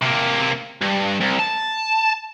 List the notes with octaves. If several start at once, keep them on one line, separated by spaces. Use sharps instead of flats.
C3 A#3
G2
C2
A5